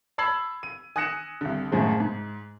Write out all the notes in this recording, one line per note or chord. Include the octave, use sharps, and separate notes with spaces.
A5 B5 E6 G#6 C7 F#7
D#7
G#5 D#6 F#6 A#6 C#7 E7
C2 D3
F#2 A2 F3 G#3
G#2